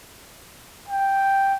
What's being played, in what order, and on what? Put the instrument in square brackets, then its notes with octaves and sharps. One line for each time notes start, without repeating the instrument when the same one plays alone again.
[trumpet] G5